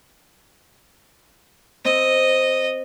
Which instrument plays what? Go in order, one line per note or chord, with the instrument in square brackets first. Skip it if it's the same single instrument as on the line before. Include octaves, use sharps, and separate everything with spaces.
[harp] C4 [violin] D#5